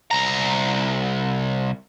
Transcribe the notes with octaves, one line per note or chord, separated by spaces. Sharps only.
C2 A#5